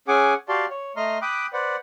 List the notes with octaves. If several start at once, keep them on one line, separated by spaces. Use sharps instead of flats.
C#4 G#4 F#5 G#5 D6
F#4 G4 D5 F5 A5 C6
C#5
A3 D#5 A#5 C6 F6
G5 B5 D6 D#6 F#6
B4 C5 D5 F#5